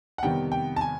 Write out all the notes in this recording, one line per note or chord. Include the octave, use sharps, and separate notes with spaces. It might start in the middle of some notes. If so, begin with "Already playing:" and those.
F#5
F2 C3 D#3 G3 B3 G5
G5
A5
G#5